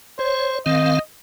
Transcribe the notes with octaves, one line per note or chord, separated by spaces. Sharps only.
C5 C#5
D#3 C4 D#5 F5